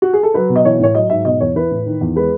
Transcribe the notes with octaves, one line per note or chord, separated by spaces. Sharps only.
F#4
G#4
A4
F#3 B4
B2
D#5
E3 C#5
A2 C#5
F#3 D#5
G#2 E5
B2 D#5
E2 C#5
E3 B4
A2
D#3
E2
G#3 B4